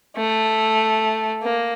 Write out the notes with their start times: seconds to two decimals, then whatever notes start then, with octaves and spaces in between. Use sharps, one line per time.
0.17 A3
1.43 A#3